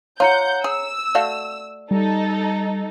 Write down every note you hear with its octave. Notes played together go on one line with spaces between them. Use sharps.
F4 C#5 F#5 A#5 G6 C#7
G#4 E6
A3 F#4 D5 F5
G3 D#4 A4